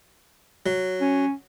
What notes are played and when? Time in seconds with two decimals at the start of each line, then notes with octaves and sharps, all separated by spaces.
0.66 F#3
1.01 C#4